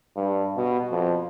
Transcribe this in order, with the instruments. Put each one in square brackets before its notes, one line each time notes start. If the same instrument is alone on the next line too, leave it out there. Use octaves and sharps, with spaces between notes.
[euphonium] G2
B2
F2